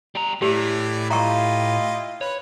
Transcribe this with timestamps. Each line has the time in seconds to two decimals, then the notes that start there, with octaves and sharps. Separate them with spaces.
0.15 G3 A#5
0.42 A2 E3 E4 G4 D5
1.10 E4 F4 G4 D#5 A#5 C#6
2.21 B4 C#5